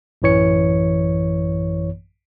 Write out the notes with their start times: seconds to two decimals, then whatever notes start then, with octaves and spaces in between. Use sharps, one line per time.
0.22 A1 F#2 E3 C#5 C#7